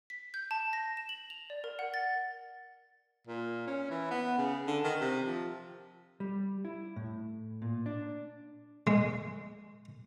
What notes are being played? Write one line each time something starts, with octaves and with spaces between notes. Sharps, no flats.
B6
G6
A5
A#6
E7
F#7
F7
D5
A#4
F#5
A6
A#2
C#4
E3
B3
C#3
D3
D#3
C3
F3
G3
E4
A2
A#2
D4
G#3